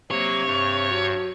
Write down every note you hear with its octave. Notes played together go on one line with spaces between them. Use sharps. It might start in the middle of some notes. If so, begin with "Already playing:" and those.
C3 F#3 A#3 C#5
G2
F#3